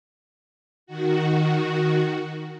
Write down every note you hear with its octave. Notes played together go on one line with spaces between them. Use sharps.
D#3 F#4